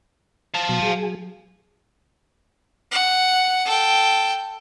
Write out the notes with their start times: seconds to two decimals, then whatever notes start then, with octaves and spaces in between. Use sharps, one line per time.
0.54 F5 A5 A6
0.69 B2 F#3
0.82 F#3 G#4
2.91 F#5
3.66 A4 G5